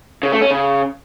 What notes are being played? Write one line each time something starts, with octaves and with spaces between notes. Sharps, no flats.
C#3
A3
C#4
C#3